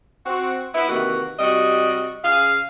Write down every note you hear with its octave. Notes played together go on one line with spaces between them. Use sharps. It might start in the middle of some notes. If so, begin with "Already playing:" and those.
C4 F#4
B3 E4
C3 D#3 E3 A#3 F#4
C3 G3 F#4 D#5
C#3 G#4 F5